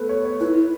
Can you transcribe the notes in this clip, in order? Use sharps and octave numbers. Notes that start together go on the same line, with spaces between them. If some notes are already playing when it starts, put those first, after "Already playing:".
Already playing: A3 B3 A4 B4
C#5
C#5
E4 B4